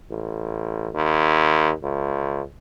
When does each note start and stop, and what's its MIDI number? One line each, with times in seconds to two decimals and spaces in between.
0.10 0.88 33
0.94 1.71 39
1.83 2.42 37